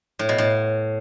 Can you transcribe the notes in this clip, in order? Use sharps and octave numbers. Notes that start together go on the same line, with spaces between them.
A2
B2
A2